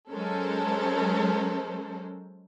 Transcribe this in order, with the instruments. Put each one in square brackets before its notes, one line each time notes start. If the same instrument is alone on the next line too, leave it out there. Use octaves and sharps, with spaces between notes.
[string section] F#3 G#3 C#4 A4 A#4 C5